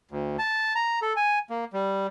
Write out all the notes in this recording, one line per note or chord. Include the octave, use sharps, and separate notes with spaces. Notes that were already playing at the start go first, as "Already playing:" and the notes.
D2
A5
A#5
A4
G#5
A#3
G3